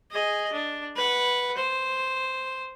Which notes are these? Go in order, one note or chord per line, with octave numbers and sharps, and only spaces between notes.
G#4 D#5
D4
B4 F#5
C5